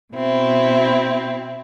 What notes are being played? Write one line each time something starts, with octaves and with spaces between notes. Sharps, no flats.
B2 C4 E4